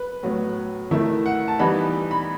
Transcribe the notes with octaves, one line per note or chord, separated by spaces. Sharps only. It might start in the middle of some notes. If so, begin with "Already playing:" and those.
Already playing: B4
A2 F#3 B3
D#3 A3 E4
F#5
A5
E3 G3 B3 D#4 B5
B5